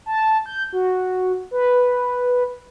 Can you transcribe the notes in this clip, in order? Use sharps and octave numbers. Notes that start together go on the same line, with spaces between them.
A5
G6
F#4
B4